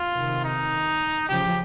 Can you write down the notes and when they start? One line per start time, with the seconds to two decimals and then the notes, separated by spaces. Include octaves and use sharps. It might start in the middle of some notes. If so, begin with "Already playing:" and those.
Already playing: F4
0.15 C3 D#3
0.44 D#4
1.29 C#3 F3 G4